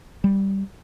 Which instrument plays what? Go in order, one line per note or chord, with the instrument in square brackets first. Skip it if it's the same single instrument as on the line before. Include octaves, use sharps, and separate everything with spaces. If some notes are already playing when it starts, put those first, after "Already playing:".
[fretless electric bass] G3